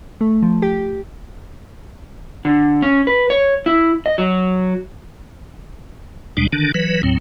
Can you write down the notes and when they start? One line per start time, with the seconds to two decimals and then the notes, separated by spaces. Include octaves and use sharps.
0.21 A3
0.42 F3
0.62 G4
2.45 D3
2.82 C#4
3.07 B4
3.30 C#5
3.66 E4
4.06 D#5
4.18 F#3
6.37 D#2 B2 G3 G#3 D4
6.53 D3 D#3 D4
6.74 E3 F#3 B4
7.03 D#2 A2 F#3 C4